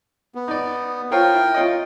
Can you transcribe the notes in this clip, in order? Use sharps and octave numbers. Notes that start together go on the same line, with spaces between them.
B3
D#4 D5
F4 A#4 C5 C#5 G5
E4
F4 C#5 D#5